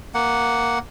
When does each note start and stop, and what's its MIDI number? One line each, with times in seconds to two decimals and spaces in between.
0.14 0.79 58
0.14 0.79 78